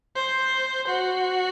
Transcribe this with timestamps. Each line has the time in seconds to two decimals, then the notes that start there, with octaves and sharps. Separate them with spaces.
0.16 C5
0.88 F#4